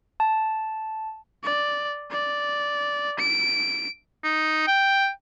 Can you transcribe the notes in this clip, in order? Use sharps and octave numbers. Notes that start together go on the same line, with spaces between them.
A5
D5
D5
D7
D#4
G5